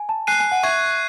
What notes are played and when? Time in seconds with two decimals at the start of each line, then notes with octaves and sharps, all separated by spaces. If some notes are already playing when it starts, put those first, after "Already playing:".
Already playing: G#5
0.09 A5
0.27 G#5 F#6 C7 D#7
0.40 G#5
0.52 F#5
0.63 E5 C#6 G#6 C7 D#7